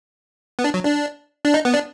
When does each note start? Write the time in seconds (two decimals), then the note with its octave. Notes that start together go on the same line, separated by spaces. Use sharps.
0.59 B3
0.64 D4
0.74 F#3
0.85 D4
1.45 D4
1.54 D#4
1.65 B3
1.74 D4